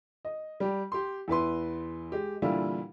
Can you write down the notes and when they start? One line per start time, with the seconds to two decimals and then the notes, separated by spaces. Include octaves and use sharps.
0.25 D#5
0.60 G3 G4
0.92 G4 C6
1.28 E2 E4 B4 C6
2.12 G#3 G4
2.42 A#2 D3 E3 G3 E4 F4